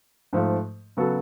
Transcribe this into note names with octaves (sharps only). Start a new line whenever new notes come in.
G#2 F3 A3
C#3 F#3 B3 F#4 A4